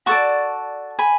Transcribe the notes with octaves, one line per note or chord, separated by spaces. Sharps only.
F#4 A4 D5 A5 C#6
G#5 B5